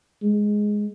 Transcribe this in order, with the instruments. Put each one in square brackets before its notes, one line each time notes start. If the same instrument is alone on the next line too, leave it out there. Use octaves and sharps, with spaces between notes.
[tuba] G#3